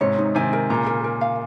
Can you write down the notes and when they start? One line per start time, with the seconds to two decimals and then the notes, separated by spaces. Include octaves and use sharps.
0.01 G#2 C3 C#5
0.18 D#4
0.35 C3 D#3 G#5
0.53 A#4
0.70 A#2 C#3 A#5
0.86 A#4
1.04 A#4
1.21 F5